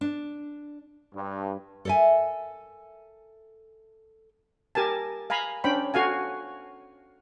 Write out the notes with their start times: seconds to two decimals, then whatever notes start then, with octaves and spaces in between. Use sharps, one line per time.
0.01 D4
1.14 G2
1.85 A4 A#4 C#5 E5 G#5
4.75 G4 A#4 G#5 A5
5.30 F5 G#5 A#5 B5
5.64 C#4 D4 C5 G5 B5
5.94 F#4 A4 F5 G#5